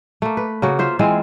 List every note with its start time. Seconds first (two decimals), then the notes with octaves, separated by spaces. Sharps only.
0.22 A3 A#3
0.37 B4
0.62 C#3 A#3 F#4
0.79 F4 C5 E5
0.99 E3 G#3 C4 F4